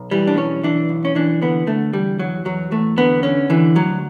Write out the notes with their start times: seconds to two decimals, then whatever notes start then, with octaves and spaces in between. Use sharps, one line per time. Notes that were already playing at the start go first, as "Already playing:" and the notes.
Already playing: B1
0.11 E3 G3
0.27 D4
0.37 B1 C#4
0.64 E3 D4
0.89 B1
1.05 C#4
1.15 E3 D4
1.42 D3 B3
1.67 D3 A3
1.93 E2 G3
2.19 E2 F#3
2.45 E2 F#3
2.72 E2 A3
2.97 D3 B3
3.23 D3 C#4
3.50 D3 E3
3.75 D2 F#3